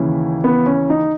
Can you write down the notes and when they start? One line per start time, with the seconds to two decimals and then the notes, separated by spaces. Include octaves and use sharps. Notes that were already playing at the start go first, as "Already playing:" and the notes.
Already playing: D#2 C#3 E3 C#4
0.44 B3
0.66 C#4
0.90 D#4